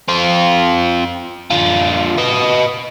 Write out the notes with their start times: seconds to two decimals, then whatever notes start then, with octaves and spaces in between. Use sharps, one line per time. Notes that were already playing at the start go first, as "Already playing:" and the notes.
0.08 C4 F4
1.50 D3 F4
2.17 B3 D#5